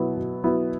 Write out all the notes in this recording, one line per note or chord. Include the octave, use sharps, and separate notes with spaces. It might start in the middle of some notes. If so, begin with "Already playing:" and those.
Already playing: B2 F#3 B3 E4
B2
F#3 B3 E4